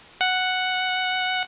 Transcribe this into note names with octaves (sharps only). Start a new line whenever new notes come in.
F#5